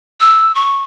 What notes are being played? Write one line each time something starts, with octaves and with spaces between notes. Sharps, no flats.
E6
C#6